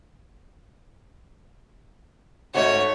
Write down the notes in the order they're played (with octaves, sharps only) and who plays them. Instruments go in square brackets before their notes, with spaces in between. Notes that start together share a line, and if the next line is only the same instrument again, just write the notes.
[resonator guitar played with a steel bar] G#2 A3 F#4 [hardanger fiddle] C#5